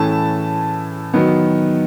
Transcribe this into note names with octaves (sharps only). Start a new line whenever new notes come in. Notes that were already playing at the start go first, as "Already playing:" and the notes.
Already playing: A2 E3 A3 C#4 A5
D#3 F#3 B3